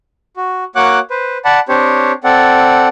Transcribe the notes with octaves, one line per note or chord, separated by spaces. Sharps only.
F#4
A#3 F#4 C#5 F#5 D6 F#6
B4 C5
D5 F#5 A5 B5
C4 D4 G4 C5 C#5
C4 A4 D5 F#5